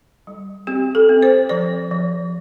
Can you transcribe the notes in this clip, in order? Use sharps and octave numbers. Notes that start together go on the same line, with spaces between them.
G3
C4 G4
A4
C4
C5
F3 D5
F3